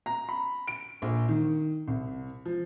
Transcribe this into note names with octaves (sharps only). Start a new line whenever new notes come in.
A#5
B5
D7
A#1
D#3
C2
F3